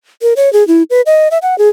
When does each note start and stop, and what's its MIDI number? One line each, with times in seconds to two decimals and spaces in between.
0.22 0.33 70
0.36 0.52 73
0.53 0.66 68
0.68 0.83 64
0.90 1.01 71
1.06 1.28 75
1.31 1.38 76
1.42 1.57 78
1.58 1.69 68